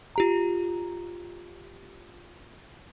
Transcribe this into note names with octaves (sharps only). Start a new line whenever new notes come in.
F4 G4 A#5